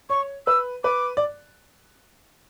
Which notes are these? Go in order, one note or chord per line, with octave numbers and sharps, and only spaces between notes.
C#5 C#6
B4 E6
B4 D6
D5